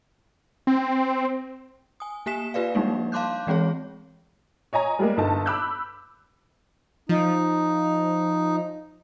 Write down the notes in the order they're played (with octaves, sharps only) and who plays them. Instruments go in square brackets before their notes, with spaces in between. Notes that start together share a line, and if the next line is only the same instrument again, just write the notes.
[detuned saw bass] C4
[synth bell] G#5 D#6
A#3 G4 G#5 B6 E7
F4 G4 B4 D5 F5
F3 G3 G#3 A#3 D4 D#4
F5 A5 C6 D6 F#6 G6
E3 G#3 C4 G#4 C#5
[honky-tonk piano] C#5 D#5 G#5 A#5
G3 G#3 A#3
G1 D#4 A4 A5
B5 D6 E6 F#6 G6
[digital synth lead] F3 [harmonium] D#4